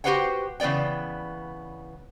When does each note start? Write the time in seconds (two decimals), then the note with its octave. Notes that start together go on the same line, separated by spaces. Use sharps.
0.04 F#4 G4 B4 C5 F#5 G5
0.60 C#3 E3 B3 D5 G5